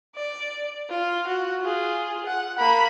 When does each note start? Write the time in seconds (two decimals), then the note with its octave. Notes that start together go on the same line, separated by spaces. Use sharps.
0.16 D5
0.90 F4
1.27 F#4
1.62 F4 G#4
2.26 F#5
2.59 A#3 B5